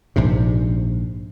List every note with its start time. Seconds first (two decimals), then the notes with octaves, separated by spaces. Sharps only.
0.16 A#1 G#2 C3